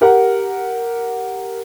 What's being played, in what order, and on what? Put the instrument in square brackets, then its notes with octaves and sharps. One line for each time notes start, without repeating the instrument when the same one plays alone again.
[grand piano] G4 A#4 F#5